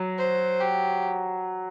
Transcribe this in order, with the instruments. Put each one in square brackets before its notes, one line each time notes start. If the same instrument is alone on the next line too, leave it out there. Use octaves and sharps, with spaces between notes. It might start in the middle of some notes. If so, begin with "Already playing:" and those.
Already playing: [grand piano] F#3
[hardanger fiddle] C5
G4